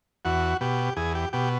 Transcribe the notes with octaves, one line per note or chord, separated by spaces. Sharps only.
E2 F#4
B2 G4
E2 G#4
G4
B2 G4